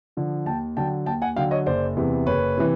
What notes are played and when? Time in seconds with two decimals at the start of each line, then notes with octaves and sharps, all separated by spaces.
0.17 D3 F3
0.46 D#2 G5 A5
0.77 D3 F#3 G5 A5
1.06 D#2 G5 A5
1.22 F#5 G#5
1.36 D3 F#3 F5 G5
1.51 C#5 D#5
1.66 F#1 C5 D5
1.97 E2 C3 E3
2.26 F#1 B4 C#5
2.58 C3 E3